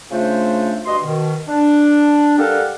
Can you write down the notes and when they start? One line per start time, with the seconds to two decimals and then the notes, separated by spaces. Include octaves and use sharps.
0.11 C#3 A3 D4 F4 C5
0.85 G2 F#4 D#5 C6
1.02 B2 D#3
1.47 D4
2.38 G3 G4 A4 A#4 F5 F#5